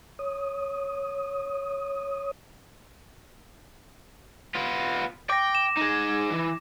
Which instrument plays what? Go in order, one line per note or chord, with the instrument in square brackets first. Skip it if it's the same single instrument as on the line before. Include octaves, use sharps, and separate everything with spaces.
[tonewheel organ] C#5 D#6
[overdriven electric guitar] B3 F4
[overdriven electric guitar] G5 [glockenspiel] D6 A#6
[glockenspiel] E7
[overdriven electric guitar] D#4 G#4
E3